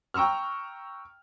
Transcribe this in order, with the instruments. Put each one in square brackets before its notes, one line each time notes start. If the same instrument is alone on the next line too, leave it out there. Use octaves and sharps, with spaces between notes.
[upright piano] G5 A#5 C#6 E6 F6